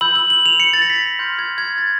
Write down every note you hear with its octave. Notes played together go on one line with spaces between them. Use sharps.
B5 E6 G6 F#7
F#7
F#7
F7
C#7
A6
A#6
B6
C6 F6 G6
G#6
G#6
A6